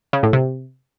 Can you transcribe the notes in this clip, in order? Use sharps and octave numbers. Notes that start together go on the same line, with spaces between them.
C#3
A2
C3